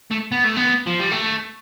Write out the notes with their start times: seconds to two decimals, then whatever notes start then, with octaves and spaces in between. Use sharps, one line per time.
0.11 A3
0.32 B3
0.44 A3
0.56 B3
0.87 F3
1.00 G3
1.12 A3